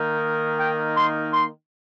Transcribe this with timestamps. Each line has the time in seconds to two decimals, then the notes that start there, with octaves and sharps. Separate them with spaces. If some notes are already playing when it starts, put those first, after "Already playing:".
Already playing: D#3 A#3 D#4
0.59 G5
0.96 C6
1.33 C6